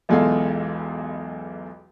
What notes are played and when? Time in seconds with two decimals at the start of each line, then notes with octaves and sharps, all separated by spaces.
0.09 B1 E2 G#3 F4 A4 F5